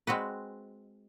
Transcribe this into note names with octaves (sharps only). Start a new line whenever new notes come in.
G#3 C4 F#4 B4